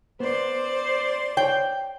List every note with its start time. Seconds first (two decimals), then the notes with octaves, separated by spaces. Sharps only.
0.20 B3 C5 D5 C6
1.37 C#5 G5